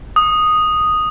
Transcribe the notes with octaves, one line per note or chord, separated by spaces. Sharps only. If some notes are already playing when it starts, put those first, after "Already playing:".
D#6